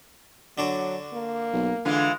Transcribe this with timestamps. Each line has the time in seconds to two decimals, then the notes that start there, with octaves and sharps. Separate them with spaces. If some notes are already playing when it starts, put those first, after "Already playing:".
0.58 D3 F#3 D4 F#4
1.13 A#3
1.53 B1
1.85 D3 E3 G#3 F4